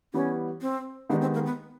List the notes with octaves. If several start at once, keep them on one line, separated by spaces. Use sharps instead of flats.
E3 G3 B3 C#4
C4
D#3 G#3 B3 D4 D#4 G4
C4
A#3
B3